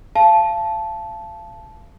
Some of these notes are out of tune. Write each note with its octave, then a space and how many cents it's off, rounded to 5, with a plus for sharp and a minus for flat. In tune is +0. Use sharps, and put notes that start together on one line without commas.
F5 -30 A5 -10